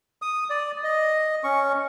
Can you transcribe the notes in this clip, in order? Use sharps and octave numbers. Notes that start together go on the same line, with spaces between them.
D#6
D5
D#5
C#4 C#6